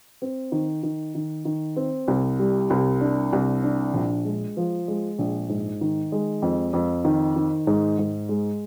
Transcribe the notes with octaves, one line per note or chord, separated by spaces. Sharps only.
C4
D#3
D#3
D#3
D#3
C4
C2
G3
C2
D4
C2
D4
A#1
G#3
F3
G#3
A#1
G#2
D#3
G#3
F2
F2
D#3
D#3
G#2
G#2
G#3